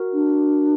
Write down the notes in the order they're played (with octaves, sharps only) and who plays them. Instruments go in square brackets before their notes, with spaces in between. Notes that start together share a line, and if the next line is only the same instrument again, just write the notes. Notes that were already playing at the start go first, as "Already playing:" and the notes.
Already playing: [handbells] F#4 A#4
[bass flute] D4